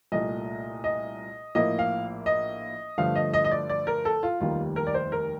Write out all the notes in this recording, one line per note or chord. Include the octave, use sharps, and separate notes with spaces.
C2 A#2 A3 D#5
D#5
A#1 A2 F3 A#3 D#5
F5
D#5
G2 D3 F3 A3 F5
D#5
D#5
D#5
D5
D5
A#4
A4
F4
F1 D#2 D#3 G3 A#3 F4
A#4
D5
C5
A#4